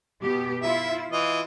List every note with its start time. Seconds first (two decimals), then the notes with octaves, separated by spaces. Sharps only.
0.22 B2 B3 G4
0.62 E4 F4 E5
1.12 E3 F4 D#5